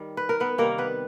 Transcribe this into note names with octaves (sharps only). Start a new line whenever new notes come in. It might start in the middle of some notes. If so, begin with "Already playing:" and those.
Already playing: D#3 G3
B4
A#4
B3 B4
C3 D#3 G3 A#3 A#4
B3 B4